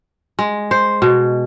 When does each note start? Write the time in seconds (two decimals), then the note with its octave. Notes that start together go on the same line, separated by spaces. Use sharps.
0.39 G#3
0.71 C5
1.02 B2